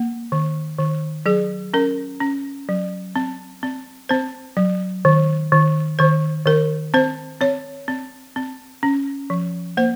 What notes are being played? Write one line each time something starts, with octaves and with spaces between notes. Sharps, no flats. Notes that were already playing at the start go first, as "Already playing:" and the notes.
Already playing: A#3
D#3
D#3
F#3 G#4
C#4 A#4
C#4
F#3
C4
C4
C4 C5
F#3
D#3
D#3
D#3 C5
D#3 A#4
C4 C5
C4 C#5
C4
C4
C#4
F3
A#3 C5